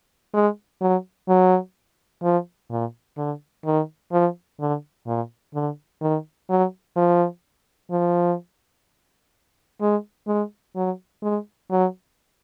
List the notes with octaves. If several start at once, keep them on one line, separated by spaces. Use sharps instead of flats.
G#3
F#3
F#3
F3
A#2
D3
D#3
F3
D3
A#2
D3
D#3
F#3
F3
F3
G#3
G#3
F#3
G#3
F#3